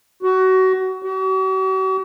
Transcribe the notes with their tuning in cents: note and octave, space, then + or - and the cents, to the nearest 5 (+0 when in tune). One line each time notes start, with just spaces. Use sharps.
F#4 +25
F#4 +45